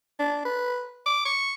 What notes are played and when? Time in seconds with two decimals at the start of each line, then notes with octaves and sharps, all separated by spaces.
0.19 D4
0.45 B4
1.06 D6
1.25 C#6